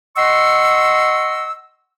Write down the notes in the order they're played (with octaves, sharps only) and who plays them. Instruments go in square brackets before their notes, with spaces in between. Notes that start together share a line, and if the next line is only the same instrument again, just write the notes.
[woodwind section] D#5 F#5 C6 C#6 E6